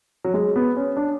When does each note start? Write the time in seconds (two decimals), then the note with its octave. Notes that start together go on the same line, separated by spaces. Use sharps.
0.24 F#3
0.34 G#3
0.56 B3
0.76 C#4
0.97 D4